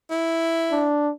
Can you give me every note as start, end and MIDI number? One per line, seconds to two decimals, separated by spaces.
0.10 0.88 64
0.71 1.11 62